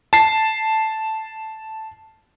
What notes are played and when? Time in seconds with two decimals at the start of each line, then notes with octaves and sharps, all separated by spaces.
0.13 A5 C7